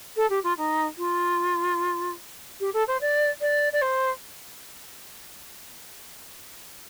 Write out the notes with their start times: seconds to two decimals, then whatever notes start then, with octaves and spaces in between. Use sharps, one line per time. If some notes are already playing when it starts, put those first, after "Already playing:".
0.16 A4
0.29 G4
0.43 F4
0.57 D#4
0.97 F4
2.60 G4
2.73 A4
2.87 C5
3.00 D5
3.41 D5
3.72 D5
3.81 C5